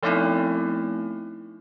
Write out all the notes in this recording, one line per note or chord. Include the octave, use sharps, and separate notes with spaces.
F3 A3 B3 C4 D#4 E4